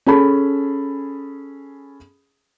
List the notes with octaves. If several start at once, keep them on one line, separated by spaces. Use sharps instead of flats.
C#4 G#4 A4 A5 B5